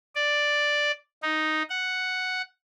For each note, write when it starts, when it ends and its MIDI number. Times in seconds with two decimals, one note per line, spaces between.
0.15 0.91 74
1.23 1.63 63
1.70 2.42 78